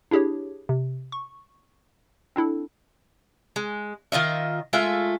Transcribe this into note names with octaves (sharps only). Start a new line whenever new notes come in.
D4 E4 G4 G#4 C#5
C3
C#6
C4 D4 E4 A4
G#3
D#3 F4 D#5 E5
G#3 A3 F4 E5